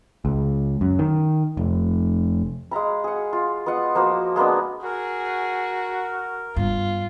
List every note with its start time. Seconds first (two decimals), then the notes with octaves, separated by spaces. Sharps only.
0.25 C#2
0.81 F#2
0.99 D#3
1.57 F1
2.71 G#3 F5 A#5 B5
3.04 G#4 F#5
3.33 F4
3.66 B3 F4 D#5 F#5
3.95 F3 A#3 F#4 C5
4.36 G#3 A#3 B3 D4
4.84 F#4 G#4 A#4
6.56 G2 B3 F4